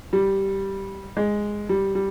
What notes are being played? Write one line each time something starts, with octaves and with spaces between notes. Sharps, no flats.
G3
G#3
G3
G3